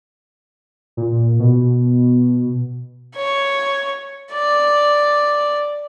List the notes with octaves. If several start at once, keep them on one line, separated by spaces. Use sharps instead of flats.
A#2
B2
C#5
D5